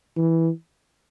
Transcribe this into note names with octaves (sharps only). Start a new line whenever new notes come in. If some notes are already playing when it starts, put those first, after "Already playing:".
E3